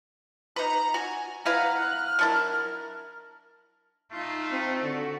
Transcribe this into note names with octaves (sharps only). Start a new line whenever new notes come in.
D#4 B4 A#5
F#4 G#5
E4 B4 F5 F#5 A#5 F6
F#6
F#3 D4 E4 A#4
A3 D#4 F4
C4
D3 F#4